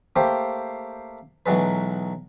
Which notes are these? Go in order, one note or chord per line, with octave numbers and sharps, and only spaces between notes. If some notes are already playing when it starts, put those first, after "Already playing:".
A3 A#3 G4 C5
B1 E3 F#3 G#3 B4